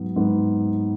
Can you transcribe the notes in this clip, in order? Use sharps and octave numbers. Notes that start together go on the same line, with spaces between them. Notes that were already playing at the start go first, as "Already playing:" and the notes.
Already playing: G#2 F#3 B3
G#2 F#3 B3